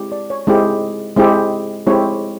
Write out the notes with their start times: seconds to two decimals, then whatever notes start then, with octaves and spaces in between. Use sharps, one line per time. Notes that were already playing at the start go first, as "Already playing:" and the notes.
Already playing: G#3 C4 E4 G4
0.12 D5
0.30 C#5
0.47 G#3 C4 E4 G4
1.16 G#3 C4 E4 G4
1.87 G#3 C4 E4 G4 C#5